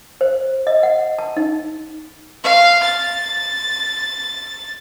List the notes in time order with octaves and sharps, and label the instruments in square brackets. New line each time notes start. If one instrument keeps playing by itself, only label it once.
[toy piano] C5
D#5
F#5
A5
D#4
[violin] F5
A6